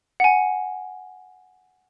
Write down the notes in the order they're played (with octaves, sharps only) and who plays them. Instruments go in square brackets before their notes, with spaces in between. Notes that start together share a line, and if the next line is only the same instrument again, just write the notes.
[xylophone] F#5 G#5